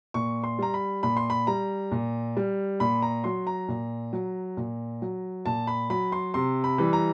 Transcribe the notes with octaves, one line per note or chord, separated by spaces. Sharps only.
A#2 C#6
C6
G3 A#5
B5
A#2 B5
C6
B5
G3 A#5
A#2
G3
A#2 B5
A#5
F#3 C6
A#5
A#2
F#3
A#2
F#3
A#2 A5
B5
F#3 B5
C6
C3 C6
B5
E3 G3
A#5